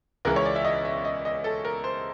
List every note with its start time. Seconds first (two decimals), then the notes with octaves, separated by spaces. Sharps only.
0.25 C#2 C#3 E3 A#4
0.36 C#5
0.45 D5
0.56 E5
0.64 D#5
0.85 E5
1.05 D#5
1.25 D#5
1.44 A4
1.65 A#4
1.84 C5